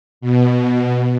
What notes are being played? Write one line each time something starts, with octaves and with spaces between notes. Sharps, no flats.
B2